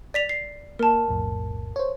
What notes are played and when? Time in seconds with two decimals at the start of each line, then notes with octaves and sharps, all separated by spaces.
0.14 D5 B6 F7
0.29 C7
0.79 A#3 A#4 A5
1.08 B1 F2 A2
1.76 C5 C#5